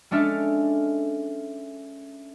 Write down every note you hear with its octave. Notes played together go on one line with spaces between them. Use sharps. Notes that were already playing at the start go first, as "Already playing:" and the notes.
G#3 C#4 D4 A4 E5 F6